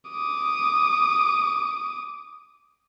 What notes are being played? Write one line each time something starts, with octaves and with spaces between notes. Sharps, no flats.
D6 D#6